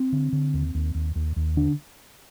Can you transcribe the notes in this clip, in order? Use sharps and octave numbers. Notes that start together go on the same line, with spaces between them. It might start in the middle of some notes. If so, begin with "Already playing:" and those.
Already playing: C4
D3
D3
D#2
D#2
D#2
D#2
D#2
D3 D4